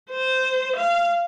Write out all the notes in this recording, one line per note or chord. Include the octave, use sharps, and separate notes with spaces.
C5
F5